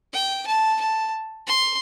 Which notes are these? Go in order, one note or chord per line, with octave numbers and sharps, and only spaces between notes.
G5
A5
A5
C6